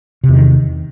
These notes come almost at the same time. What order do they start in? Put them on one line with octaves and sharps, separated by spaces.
C3 E2 D#3